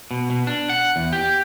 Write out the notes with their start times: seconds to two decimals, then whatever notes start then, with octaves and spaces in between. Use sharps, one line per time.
0.11 B2
0.30 B2
0.47 D4
0.69 F#5
0.96 E2
1.13 G4